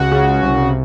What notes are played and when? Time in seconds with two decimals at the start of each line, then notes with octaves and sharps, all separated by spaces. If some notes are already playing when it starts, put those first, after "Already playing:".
Already playing: C#2 F#4
0.11 C#3
0.43 C2